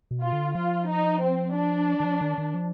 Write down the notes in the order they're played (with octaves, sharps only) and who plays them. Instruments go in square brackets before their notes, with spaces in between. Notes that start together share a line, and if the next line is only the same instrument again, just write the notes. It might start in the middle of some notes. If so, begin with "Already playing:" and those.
[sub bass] B2
[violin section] F4
[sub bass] D3
[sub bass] F3 [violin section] F4
[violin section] D#4
C4
D4
[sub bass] D#3
F3
D#3
D#3
F3